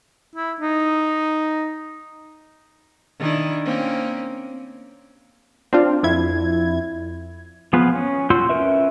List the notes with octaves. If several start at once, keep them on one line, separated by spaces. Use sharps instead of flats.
E4
D#4
D#3 D4 E4
A#3 C4 C#4
C4 D4 F4
F2 E4 G#6
F3 B3 F4 G#4 B4
C#4
F4 F#4 C6 E6 G6
C#4 E4 A#4 B4 E5